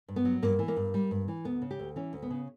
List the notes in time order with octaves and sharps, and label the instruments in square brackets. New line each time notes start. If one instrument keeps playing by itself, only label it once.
[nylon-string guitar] G2
B3
F#3
G2 A#3
E3
A#3
G2
G3
G2
E3
D2 B3
C#3
G4
D2
E3 C#4
D2
B3
C#3